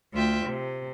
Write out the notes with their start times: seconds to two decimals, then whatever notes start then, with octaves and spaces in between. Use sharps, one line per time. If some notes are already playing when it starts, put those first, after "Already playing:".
0.14 D2 F4 E5 G5
0.47 C3